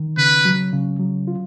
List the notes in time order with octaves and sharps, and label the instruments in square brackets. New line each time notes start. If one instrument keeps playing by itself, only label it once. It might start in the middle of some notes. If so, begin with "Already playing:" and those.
Already playing: [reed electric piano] D#3
[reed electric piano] C#3 [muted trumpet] B4
[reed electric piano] F#3
C#3
F#3
F4